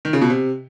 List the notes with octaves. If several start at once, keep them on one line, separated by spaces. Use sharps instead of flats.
D#3
C#3
B2
C3